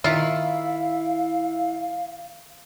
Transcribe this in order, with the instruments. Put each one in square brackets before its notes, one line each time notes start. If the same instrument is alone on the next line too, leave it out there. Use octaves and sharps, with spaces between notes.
[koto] D#3 F4 [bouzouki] E4 [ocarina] F5